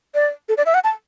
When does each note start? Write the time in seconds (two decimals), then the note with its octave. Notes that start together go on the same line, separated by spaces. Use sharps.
0.15 D5
0.49 A4
0.57 D5
0.66 E5
0.74 F#5
0.84 A5